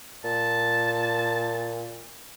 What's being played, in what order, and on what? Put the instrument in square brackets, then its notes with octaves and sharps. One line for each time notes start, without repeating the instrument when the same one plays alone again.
[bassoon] A#2 [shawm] A5